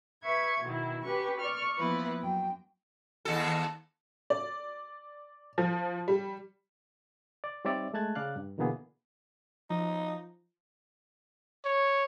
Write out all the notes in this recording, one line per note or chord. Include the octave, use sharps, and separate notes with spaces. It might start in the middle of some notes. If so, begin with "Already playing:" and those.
B4 E5 C#6 G#6
B2 D#3 E4
C#4 G4 B4 C#6
D5 C#6 F6
E3 F3 A#3 B3 E4 B4
F#2 G5
D#2 A4
D5
F3
G3
D5
G3 C4 D#4 C#5 D5 E5
G#3 A3 A5 F#6 G#6 A6
C#3 D5 F5 F#6
G2
B2 D3 E3 A#3 B3 G#4
F3 D#4
C#5